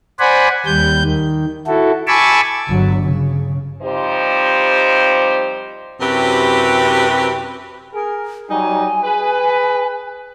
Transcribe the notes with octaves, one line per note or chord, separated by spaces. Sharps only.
C5 D5 F#5 G#5 B5
D#2 G3 G6
D#3
E4 F#4 A4
G#5 A5 B5 C#6 D6 E6
G1 F#3
C#3
F3 G3 C4 D#4 G4 C5
F#2 C3 E4 F#4 G4 B4
G#4 A#4
F#3 G3 D#4 G#5
G#4 B4